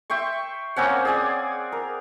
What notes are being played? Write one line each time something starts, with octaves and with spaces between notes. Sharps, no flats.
E5 G5 C6 C#6
A#3 C4 C#4 F#5
G#4 D5 G#5
A#4